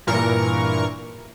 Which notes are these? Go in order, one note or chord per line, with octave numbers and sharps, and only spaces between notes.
G2 A#2 E3 A#4 C#6